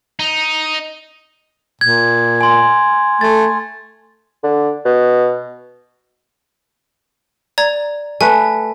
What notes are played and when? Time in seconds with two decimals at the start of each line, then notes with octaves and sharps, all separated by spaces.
0.19 D#4
1.81 A#2 G#6
2.41 G#5 C6
3.21 A3 A6
4.44 D3
4.85 B2
7.58 D5 A#5 G#6
8.21 A3 B4 G#5